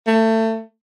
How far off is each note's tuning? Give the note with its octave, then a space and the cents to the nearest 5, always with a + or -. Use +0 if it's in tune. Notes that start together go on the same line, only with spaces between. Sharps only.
A3 +25